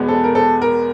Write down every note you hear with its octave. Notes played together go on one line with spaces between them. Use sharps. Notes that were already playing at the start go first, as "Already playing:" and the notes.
Already playing: E2 B2 G#3 B3
A4
A#4
A4
A#4